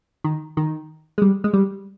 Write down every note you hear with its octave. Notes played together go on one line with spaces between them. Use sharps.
D#3
D#3
G#3
G3
G#3
G3